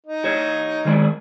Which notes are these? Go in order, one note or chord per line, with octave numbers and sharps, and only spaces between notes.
D#4
G4 C#5
D#3 G#3 D5